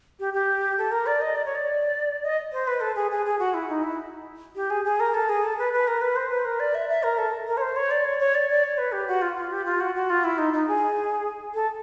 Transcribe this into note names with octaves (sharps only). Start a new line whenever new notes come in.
G4
G4
A4
A#4
D5
D#5
D5
C#5
D5
D#5
C5
B4
A4
G#4
G#4
G#4
F#4
E4
D#4
E4
G4
G#4
G#4
A#4
A4
G#4
A4
B4
B4
A#4
B4
C5
B4
A#4
D5
E5
E5
A#4
A4
A#4
C#5
C5
C#5
D5
C#5
C#5
D5
D5
C#5
B4
G4
F#4
F4
F4
G4
F4
F#4
F#4
F4
E4
D#4
D#4
G#4
A4